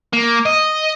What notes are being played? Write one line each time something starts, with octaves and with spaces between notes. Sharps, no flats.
A#3
D#5